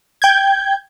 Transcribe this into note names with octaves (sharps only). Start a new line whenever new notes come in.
G5 G6 G#6